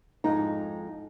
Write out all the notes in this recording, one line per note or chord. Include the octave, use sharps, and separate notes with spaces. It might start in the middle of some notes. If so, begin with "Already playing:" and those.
F2 G#2 D#4